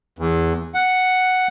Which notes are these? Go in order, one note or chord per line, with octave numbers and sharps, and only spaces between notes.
E2
F#5